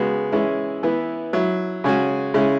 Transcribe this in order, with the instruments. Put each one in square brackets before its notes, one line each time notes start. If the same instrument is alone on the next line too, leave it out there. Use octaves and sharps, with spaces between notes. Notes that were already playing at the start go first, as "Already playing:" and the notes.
Already playing: [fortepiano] C#3 G#3 B3 F#4
E3 G#3 C#4 E4
E3 B3 E4
F#3 E4
C#3 G#3 C#4 F#4
C#3 G#3 C#4 E4